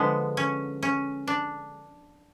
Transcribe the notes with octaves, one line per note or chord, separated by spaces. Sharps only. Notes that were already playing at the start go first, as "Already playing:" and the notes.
Already playing: D3 F3 G#3 B3
C#4
C#4
D4